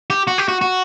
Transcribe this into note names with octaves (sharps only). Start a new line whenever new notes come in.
G4
F#4
G4
F#4
F#4